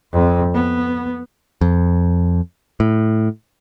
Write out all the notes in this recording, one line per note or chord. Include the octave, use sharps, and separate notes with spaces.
F2
B3
F2
A2